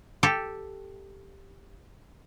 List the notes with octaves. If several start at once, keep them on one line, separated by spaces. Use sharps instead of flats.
G4 A4